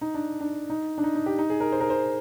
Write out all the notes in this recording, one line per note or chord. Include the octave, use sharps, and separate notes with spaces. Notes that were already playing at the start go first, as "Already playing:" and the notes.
D#4
D4
D4
D#4
D4
D#4
D#4
G4
D#4
G#4
A#4
C5
A#4
C5